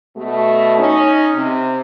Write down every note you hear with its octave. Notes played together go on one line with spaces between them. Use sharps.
B2 A3
C#4 D#4
C3